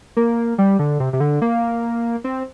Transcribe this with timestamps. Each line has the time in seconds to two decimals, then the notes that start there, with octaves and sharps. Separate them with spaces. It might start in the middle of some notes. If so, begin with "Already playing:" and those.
0.17 A#3
0.58 G3
0.79 D3
1.00 C3
1.13 C3
1.20 D3
1.42 A#3
2.24 C4